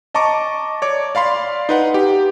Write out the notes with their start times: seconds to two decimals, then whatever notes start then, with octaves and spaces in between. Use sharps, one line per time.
0.14 D#5 A5 A#5 C#6 D6
0.82 C#5 D5 D6
1.15 D5 F5 B5 C6
1.69 D#4 B4 F#5
1.94 G4